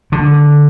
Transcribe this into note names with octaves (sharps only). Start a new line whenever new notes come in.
D3